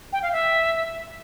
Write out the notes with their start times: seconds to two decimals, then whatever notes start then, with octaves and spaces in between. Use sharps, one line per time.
0.13 G5
0.22 F5
0.32 E5